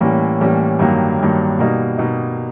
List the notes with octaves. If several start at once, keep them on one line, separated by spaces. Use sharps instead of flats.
A2 E3 G3 A#3 C#4
A2 E3 G3 A#3 C#4
G2 D#3 F#3 A#3
G2 D#3 F#3 A#3
B2 G3 A#3 D#4
B2 G3 A#3 D#4